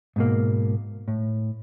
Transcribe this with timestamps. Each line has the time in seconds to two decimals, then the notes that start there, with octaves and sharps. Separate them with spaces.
0.16 G#2 B2 A#3
1.08 A2